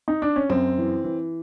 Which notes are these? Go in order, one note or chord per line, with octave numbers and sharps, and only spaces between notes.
D#4
D4
C#4
F#2 C4
E3
E3